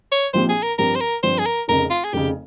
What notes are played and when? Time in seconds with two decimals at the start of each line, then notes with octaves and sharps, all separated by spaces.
0.12 C#5
0.33 A#1 A#2 F3 C4 G4 C5
0.49 G#4
0.63 A#4
0.78 G2 F3 C4 G4 A#4
0.95 C5
1.01 A#4
1.23 G2 F3 C4 G4 C5
1.39 G#4
1.46 A#4
1.68 F1 F2 C#3 A#4
1.90 F4
2.04 G#4
2.13 F1 F2 C#3 G4